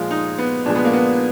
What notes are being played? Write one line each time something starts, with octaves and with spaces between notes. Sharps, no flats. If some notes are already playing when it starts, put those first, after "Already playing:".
Already playing: A#2 F3 G#3 F4
D#4
B3
A#2 F3 G#3 D4
B3
A#3
B3